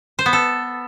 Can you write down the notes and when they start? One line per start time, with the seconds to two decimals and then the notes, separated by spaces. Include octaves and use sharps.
0.19 C5
0.26 B3
0.33 A4